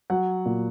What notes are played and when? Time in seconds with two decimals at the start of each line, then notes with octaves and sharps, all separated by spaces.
0.10 F#3 F#5
0.45 A#2